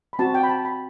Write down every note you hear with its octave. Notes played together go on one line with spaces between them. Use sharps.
B5
C4 F#4 A5
G5
B5
A5
B5